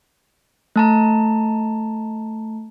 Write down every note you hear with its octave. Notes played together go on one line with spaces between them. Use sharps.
A3 A5 A#5